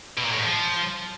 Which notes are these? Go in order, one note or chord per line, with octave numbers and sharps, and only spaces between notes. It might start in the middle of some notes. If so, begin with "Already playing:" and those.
B2
A#2
A2
G#2
F3